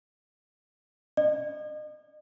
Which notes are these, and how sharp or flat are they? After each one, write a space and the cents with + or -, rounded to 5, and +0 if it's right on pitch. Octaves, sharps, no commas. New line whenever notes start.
D#5 -40